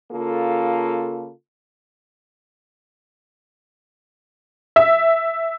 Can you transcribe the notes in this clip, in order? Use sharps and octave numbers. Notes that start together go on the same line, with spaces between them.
C#3 A#3 F4 A4
E5